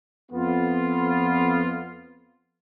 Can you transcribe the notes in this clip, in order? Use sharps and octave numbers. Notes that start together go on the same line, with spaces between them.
F2 B3 F4